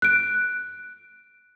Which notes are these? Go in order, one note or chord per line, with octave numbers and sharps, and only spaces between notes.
F#6 D7